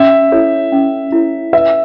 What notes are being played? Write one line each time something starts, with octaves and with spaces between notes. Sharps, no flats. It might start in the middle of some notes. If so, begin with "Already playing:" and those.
Already playing: C#4 E5
E4 A4 C#5
C#4
E4 A4 C#5
B4 E5